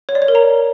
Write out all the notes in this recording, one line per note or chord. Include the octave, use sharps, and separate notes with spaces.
C#5
D5
C#5
A#4
A#5